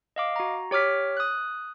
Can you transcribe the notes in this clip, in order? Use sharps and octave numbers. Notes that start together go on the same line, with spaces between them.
D#5 F5 D6
F#4 A#5
G4 C#5 D6 F6 B6
D#6 F#6